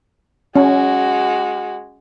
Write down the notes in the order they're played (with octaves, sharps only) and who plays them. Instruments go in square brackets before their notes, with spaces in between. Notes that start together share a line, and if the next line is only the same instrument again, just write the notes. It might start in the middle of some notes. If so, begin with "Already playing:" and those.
[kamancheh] G#3 F#4 [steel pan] C#4